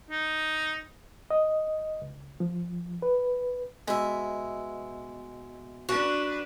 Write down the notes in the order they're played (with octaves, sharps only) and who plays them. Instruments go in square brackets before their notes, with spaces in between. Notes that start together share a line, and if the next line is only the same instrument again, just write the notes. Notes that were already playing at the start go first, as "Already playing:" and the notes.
[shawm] D#4
[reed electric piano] D#5
C#2
F3
B4
[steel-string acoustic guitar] B2 E5 [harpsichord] G#3
[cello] D4 B4 [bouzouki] F#4